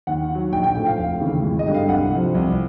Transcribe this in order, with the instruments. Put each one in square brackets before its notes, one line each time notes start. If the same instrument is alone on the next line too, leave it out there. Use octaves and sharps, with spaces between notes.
[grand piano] D#2 F#5
D#3 F#3
A#1 G5
G5
A2 F3 G5
F5
F1 F5
D#2 C#3 E3
G#1
D#5
G2 D3 G3
F5
C2 F#5
C3 F3
C2